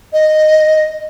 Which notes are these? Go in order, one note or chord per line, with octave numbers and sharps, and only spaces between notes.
D#5